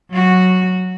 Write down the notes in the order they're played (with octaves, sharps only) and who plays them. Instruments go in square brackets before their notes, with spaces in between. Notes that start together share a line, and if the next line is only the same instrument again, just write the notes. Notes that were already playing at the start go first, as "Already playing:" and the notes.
[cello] F#3 F#4